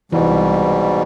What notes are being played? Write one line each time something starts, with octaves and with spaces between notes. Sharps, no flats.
C2 G#2 B2 E3 G3